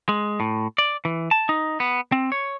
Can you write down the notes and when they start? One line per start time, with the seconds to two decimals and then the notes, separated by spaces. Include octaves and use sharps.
0.09 G#3
0.40 A2
0.78 D5
1.05 E3
1.31 A5
1.49 D#4
1.80 B3
2.12 C4
2.32 C#5